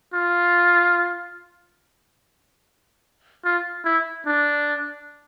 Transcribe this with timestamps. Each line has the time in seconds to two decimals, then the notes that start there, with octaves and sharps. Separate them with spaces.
0.14 F4
3.45 F4
3.85 E4
4.26 D4